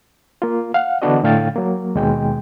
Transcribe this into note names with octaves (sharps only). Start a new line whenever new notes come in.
A#3 F4
F5 F#5
D3 E3 B3 D4 F#4 D#5
A2 D3 A3 F5 G5 A6
F#3 A#3
D#2 B2 G#3 G5